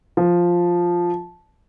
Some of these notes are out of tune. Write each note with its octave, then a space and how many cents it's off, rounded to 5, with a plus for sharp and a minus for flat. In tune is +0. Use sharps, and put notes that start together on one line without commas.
F3 +0